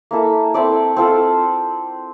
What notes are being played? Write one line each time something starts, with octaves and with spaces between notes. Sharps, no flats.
A#3 E4 A4 E5
C4 E4 A4 D5
C4 F4 A4